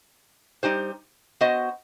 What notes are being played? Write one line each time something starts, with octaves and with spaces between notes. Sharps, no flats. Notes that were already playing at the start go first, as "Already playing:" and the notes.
G3 D#4 G4 C5
B3 F#4 C5 D#5